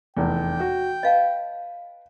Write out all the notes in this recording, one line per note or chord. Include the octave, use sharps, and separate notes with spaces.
F1 E2 G5
F#4
B4 D#5 F5 A5